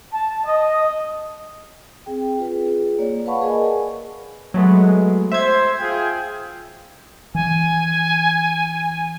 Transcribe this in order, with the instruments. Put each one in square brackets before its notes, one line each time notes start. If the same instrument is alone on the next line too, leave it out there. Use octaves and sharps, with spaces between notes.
[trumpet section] A5
D#5
[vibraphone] C4 G#4 G5
F4 G#4 B4
A#3 C#5 D5
B4 F5 F#5 A5 B5 C#6
G#4 A#4 D5 D#5 G#5
[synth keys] F#3 A3 B3 [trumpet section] G#3
[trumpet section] C5 [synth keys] E5 G#6
[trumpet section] F4 G#4 G5
[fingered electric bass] E3 [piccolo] G#5